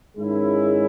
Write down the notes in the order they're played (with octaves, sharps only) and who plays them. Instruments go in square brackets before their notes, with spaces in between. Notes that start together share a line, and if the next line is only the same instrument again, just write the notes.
[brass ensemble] G#2 D#3 G#3 C#4 E4